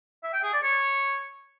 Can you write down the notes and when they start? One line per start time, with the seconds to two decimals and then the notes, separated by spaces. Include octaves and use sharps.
0.24 E5
0.33 G5
0.43 G#4
0.53 D5
0.63 C#5